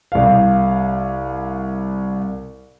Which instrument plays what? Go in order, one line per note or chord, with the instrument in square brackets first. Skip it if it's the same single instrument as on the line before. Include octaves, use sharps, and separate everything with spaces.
[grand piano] C2 F5